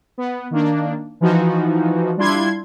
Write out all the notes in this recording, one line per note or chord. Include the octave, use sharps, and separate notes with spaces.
B3
D#3 A#3 D4
E3 F3 D#4 F#4
G3 D4 E4 F4 C6 G#6